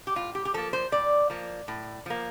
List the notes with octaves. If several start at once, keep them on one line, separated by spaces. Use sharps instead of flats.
G4
A2 F4
G4
G4
F3 A#3 A4
C5
A2 D5
F3 A#3
A2
F3 A#3